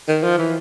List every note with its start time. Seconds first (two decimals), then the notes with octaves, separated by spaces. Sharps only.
0.08 D#3
0.23 F3
0.38 E3